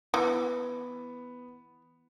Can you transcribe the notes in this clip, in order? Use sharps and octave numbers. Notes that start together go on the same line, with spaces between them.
E3 B3